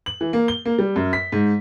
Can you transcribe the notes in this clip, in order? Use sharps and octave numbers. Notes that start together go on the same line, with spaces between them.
F#7
E3
A#3
G7
A#3
G3
F#2
B6
G#2